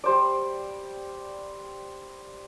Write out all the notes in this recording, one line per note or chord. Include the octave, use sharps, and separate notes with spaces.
G3 C5 D5